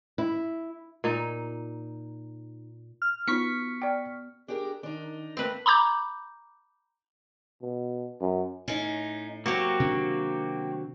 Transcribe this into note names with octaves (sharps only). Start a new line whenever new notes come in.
E4
A#2 D#4
F6
B3 D#4 F4 C#6 B6 C#7
D5 G5
D4 G4 G#4 A#4
D#3 D4 D#4
A3 A#3 C4 B4
A#5 B5 D6 G6
B2
F#2
A2 C#4 D#4
F#3 A#3 C4 F#4 G4
C3 D#3 D4